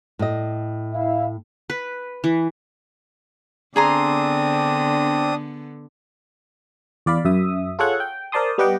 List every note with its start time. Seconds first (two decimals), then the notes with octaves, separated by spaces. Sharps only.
0.19 A2 D#5
0.94 E4 E5 F5
1.70 B4
2.24 E3
3.76 D3 B3 C4 D4 G#4 A#5 C6 D#6
7.06 E2 D5 F5 B5
7.25 F#2 E5 D#6
7.79 F4 G#4 A4 C#5 F#5 C#6
8.00 G5
8.32 A#4 C5 D5 A5 C6 D#6
8.58 G3 B3 G4 D#5 F#5 G5